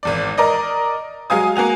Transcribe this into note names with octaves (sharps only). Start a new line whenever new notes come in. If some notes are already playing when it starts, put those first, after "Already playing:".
G#1 E2 D5
A#4 D5 D#5
F#3 G#3 F5 G#5 D#6
A#3 F#4 G#5 F7